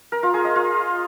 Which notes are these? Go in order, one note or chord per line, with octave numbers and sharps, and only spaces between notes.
A#4
F4
G#4
D#5
F4